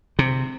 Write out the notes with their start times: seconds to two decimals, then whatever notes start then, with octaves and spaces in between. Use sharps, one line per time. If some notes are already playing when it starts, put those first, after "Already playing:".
0.19 C3